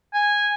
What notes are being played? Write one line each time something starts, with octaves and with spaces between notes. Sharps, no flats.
G#5